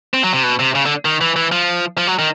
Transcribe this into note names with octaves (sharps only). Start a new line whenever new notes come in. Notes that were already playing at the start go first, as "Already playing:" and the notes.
C4
F#3
C3
B2
C3
C#3
D3
D#3
E3
E3
F3
F3
F#3
D#3